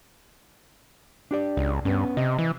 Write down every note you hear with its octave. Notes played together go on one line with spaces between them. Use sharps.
D4 G4 D5
C#2
G2 B3 C#4
C3 D#5
E3